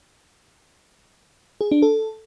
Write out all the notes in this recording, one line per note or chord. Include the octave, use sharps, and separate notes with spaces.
G#4
D4
A4